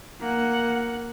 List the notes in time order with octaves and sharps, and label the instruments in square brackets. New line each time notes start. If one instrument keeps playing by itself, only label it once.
[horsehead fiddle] A#3 F#5